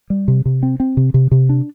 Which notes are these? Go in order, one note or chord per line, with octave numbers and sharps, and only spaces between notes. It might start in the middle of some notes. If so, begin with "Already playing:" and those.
G3
C3
C3
C4
C4
C3
C3
C3
D4